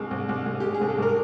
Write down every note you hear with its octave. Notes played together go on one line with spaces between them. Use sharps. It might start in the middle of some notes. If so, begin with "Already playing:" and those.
Already playing: C2 G#3
C2
C2
C2
G#3 G4
G#4
C2
A4
C2 A#4